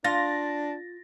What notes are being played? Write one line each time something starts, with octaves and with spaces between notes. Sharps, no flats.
D4 F4 A6 A#6